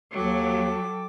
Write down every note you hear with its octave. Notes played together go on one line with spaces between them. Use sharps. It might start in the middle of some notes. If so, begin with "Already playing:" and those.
D#2 F#3 A4 G5 D6